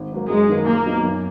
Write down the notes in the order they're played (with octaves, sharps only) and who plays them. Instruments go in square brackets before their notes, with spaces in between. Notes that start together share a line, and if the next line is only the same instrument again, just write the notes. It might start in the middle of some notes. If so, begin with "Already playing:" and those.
Already playing: [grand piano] G#1
G#2 F#3 A#3
[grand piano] F#2 [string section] G#3
[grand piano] D#3 A#3
[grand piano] A#2 [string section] A#3
[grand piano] F#3 B3 D#4
F#2